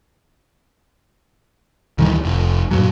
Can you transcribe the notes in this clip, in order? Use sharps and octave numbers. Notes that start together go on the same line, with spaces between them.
D2 D#3 E3 G3
F1
G2 A#2 F#3